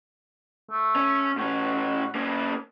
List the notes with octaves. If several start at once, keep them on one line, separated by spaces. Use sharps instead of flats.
A3
C#4
A2 C#4 F#4
A#3 C#4